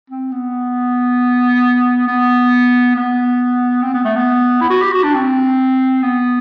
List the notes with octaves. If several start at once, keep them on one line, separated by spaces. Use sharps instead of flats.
C4
B3
B3
B3
C4
B3
A3
B3
E4
F#4
G4
F#4
D4
C4
B3